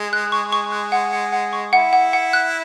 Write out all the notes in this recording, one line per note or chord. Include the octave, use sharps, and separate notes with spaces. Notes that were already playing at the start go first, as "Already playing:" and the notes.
Already playing: G#3
F#6
C#6
C#6
F#6
F#5
F#5
F#5
C#6
E4 F#5
F#5
F#5
F#6